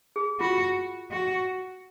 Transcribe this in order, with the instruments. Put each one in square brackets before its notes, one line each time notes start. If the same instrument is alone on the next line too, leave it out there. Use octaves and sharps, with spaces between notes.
[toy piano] G#4
[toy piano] F4 [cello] F#4
[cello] F#4